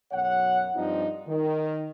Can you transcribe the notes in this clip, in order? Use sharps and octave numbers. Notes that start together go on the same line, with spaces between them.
B1 F#2 C#5 F#5
G2 F3 C4 D4 D#4 F4
D#3